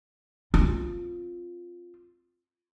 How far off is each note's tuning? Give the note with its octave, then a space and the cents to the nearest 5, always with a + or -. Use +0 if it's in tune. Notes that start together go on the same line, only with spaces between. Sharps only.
C4 +0 F4 +0